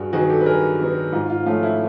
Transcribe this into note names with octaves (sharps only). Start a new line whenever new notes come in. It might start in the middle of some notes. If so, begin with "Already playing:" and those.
Already playing: G2 F#4 G#4
D#3 F#3 B3 F#4 G#4
G4 A4
B4
G2 G#4 A#4
D#3 F#3 B3
G#2 F4
F4
F3 A3 C#4 F4
E4